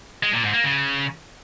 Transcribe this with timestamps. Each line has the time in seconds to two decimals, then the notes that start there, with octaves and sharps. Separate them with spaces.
0.23 G#3
0.33 A#2
0.43 G#2
0.54 A#3
0.64 C#3